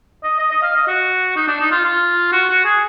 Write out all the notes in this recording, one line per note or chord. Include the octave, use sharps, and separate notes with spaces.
D#5
D#5
D#5
F5
D#5
F#4
D#4
D4
D#4
F4
F4
F#4
F#4
G#4